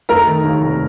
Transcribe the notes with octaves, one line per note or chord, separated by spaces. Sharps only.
A3 A#4 A#5
D#3
D#2
F1